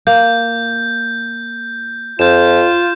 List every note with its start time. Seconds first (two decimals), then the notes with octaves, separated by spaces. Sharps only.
0.07 A#3 G6
2.19 F2 F4 G6 E7